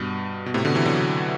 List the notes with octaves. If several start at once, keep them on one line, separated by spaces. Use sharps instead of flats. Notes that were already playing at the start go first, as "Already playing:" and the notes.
Already playing: G2 B2
B2
A2 C3
B2 D3
C3 E3
D3 F#3